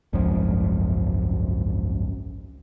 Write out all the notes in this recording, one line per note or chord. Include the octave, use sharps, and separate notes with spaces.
G#1 C#2 F#2 F3